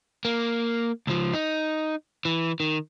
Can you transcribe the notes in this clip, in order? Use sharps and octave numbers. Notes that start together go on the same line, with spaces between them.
A#3
C#2 F3
D#4
E3
D#3